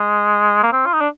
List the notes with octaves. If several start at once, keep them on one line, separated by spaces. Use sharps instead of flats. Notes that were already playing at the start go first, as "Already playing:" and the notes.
Already playing: G#3
A#3
C4
F4
D#4
D4